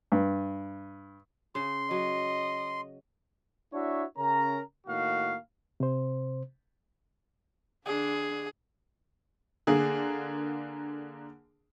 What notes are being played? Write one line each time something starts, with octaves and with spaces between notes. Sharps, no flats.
G2
C#3 C6
F#3 D#5
D4 E4 F#4 C#5 E5
C#3 C#4 A#4 A#5
A2 D#3 A#3 F#4 F5
C3 C5
D3 D4 G#4
D3 A#3 G#4